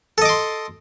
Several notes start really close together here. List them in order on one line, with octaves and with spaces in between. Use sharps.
A4 D#5 D6 C6